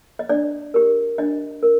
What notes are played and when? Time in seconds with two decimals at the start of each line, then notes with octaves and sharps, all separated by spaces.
0.19 D#5
0.29 D4 D5
0.74 G4 A#4
1.18 D4 D#5
1.63 A#4